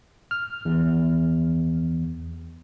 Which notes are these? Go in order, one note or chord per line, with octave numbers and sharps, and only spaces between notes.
F6
E2